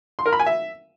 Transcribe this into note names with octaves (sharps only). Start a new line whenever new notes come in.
C6
A#4
B5
G#5
E5